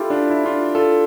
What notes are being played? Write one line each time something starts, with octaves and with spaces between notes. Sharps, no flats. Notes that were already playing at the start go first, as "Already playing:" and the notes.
Already playing: E4 F4 G4 A4
D4 F4
E4
D4 F4
F4 A4